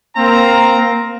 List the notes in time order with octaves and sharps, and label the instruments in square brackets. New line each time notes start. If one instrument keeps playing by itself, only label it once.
[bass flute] A#3 [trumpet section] C4 F5 A#5